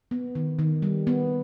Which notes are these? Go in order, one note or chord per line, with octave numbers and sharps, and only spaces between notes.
B3
D#3
D#3
G3
B3